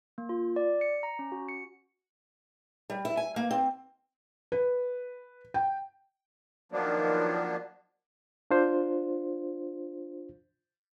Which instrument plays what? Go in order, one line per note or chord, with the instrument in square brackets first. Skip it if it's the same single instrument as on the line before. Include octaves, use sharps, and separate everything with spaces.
[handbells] A#3
F4
D5
C#7
A#5
C#4
F#4
C#7
[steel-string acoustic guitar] G3
E4
G#5
A#3
C4
[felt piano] B4
G5
[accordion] D#3 F3 F#3 A#3 B3 D4
[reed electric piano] D4 F4 C5